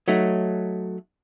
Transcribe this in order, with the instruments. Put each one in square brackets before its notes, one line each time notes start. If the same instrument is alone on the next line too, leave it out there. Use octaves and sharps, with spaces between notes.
[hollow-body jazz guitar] F#3 A3 D#4